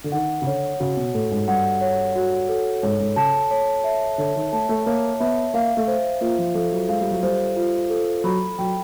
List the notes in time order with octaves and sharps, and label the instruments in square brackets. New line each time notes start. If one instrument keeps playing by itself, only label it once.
[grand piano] D3
[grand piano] D#3 [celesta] F#5
[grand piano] C#3
[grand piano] D3 [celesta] C#5
[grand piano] C#3 [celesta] F#4
[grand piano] B2
[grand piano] A2 [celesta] A4
[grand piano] G#2
[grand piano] G2 [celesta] F#5
[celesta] C#5
F#4
A4
[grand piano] G#2 [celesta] C#5
[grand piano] G#2
[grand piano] C#3 [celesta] A5
[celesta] C#5
E5
[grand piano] D3 [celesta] C#5
[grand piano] D#3
[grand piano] A3 [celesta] A5
[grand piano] A3
[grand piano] A#3 [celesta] C#5
[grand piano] B3 [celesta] E5
[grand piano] A#3 [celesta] F5
[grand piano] A3
[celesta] C5
[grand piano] A#3 [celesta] F4
[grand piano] F3
[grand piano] F3 [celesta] A4
[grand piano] F#3
[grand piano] G#3 [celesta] F5
[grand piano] G3
F#3
[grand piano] G3 [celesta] C5
[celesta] F4
A4
[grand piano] F#3 [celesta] B5
[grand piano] F#3 [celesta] G5